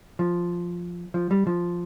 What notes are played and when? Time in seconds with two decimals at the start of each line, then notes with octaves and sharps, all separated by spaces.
0.19 F3
1.14 F3
1.31 G3
1.47 F3